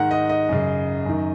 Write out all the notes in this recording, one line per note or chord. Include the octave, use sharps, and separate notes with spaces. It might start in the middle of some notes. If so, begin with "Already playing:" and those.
Already playing: G#2 D#3 F#5
D#5
D#5
F#2 C#3
F#2 D#3